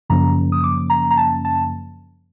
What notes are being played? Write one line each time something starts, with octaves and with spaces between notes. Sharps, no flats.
F#2 C#3 F3 A#3 C#4 A#5
D#6
D6
A#5
A#5
A5
A5